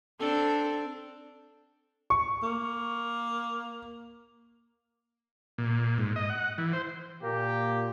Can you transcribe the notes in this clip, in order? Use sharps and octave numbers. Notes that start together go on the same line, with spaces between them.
C4 D4 A4
C#6
A#3
A#2
G#2
D#5
F#5
E3
C5
A#2 A#3 G4